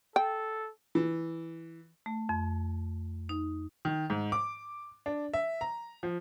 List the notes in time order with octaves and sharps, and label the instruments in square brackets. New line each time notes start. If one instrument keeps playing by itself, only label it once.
[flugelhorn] A4 [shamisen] G5
[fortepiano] E3
[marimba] A3
F2
D#4
[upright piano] D#3
G#2
D6
D4
E5
A#5
F3